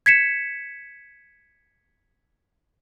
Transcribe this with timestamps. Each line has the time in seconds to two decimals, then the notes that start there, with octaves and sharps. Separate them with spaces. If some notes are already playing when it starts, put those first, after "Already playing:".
0.06 G#6 B6 C#7 E7